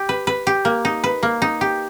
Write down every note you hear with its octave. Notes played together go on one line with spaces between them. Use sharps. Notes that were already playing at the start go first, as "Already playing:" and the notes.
Already playing: G4
B4
B4
G4
A#3
D#4
B4
A#3
D#4
G4